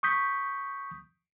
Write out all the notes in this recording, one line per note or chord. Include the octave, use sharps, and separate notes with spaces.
C#6 D#6 G6 B6